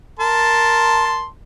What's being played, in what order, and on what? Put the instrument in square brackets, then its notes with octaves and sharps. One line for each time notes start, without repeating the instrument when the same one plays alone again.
[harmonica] A#4 A5 C6